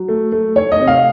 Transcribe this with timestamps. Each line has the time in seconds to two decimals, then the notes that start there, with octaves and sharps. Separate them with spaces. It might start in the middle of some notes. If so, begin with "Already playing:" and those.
Already playing: F#3
0.08 A3
0.32 A3
0.56 A3 C#5
0.72 D#5
0.80 C3
0.88 F5